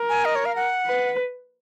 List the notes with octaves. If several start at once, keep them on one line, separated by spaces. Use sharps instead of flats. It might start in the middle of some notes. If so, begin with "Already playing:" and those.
Already playing: A#4
G#5
D#5
C#5
F5
F#5
B4